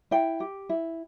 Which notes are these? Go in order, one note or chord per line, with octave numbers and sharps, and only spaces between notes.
E4 G5
G4
E4